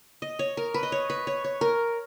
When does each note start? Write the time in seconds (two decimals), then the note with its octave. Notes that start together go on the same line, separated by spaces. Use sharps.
0.22 D#5
0.39 C#5
0.57 A#4
0.74 B4
0.83 D#5
0.92 C#5
1.10 B4
1.27 C#5
1.44 C#5
1.61 A#4